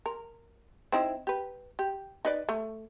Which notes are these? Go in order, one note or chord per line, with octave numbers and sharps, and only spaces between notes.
A#4
C4 D#4 E4
G4 B4
G4
D#4 B4 D5
A3